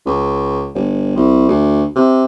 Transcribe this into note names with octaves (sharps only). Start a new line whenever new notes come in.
C#2
G1
C2
D2
C3